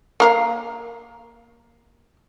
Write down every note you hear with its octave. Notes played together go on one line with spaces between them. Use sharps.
A#3 A#4 F5